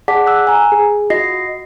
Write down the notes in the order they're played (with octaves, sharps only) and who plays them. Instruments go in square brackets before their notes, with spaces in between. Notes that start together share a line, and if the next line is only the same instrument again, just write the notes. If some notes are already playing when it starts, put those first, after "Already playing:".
[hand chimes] G#4 D5 F#5 A5 D6 B6
E6 F#6
G#5 A#5
G#4
F4 F#4 D#5 A#6 C7